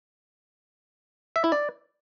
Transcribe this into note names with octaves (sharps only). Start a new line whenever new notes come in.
E5
E4
D5